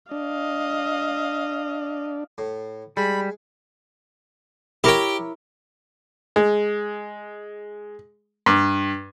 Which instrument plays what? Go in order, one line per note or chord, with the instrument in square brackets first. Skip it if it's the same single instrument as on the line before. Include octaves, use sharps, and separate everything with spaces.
[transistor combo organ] D4 [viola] D#5 F5
[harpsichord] A2
[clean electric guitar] G3 [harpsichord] G#3 [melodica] B5
[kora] E4 A#4 C#5 [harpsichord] G4 G5
[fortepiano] G#3
G2